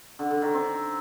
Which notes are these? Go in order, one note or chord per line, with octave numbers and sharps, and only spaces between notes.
D3
D3
D#3
C4